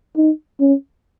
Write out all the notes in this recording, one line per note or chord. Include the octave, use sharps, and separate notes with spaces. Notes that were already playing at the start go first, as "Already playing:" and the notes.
D#4
C#4